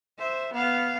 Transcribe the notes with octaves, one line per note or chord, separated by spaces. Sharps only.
C5 E5
B3 F5